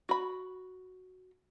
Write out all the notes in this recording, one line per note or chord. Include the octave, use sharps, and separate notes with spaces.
F#4 B5